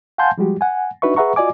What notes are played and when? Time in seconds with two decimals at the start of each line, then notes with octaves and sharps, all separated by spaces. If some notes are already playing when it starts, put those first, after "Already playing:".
0.18 F5 F#5 G#5 A5 C6 G6
0.38 F3 G3 G#3 F#4 G4
0.61 F#5 G#5
1.02 D4 D#4 F#4 B4 E5 C#6
1.16 G#4 B4 E5 F#5 A#5 C#6
1.36 F4 F#4 D5 D#5 G#5 D6